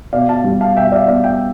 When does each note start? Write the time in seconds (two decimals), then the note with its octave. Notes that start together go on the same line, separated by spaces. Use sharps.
0.13 B2 D5 F5
0.29 F5 A5
0.44 G3
0.61 F5 A5
0.76 B2 E5 G5
0.87 E5
0.92 D5 F5
1.08 B3 D5 F5
1.24 E5 G5